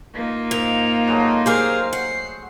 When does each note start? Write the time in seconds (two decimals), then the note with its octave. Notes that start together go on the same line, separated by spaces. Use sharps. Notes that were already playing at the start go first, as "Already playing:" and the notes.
0.12 A#3 D#4 F4
0.51 G#2 A#4 F7
1.07 F#3 G#3 A3
1.46 G4 G#4 A#4 C5 F5
1.93 F#5 C7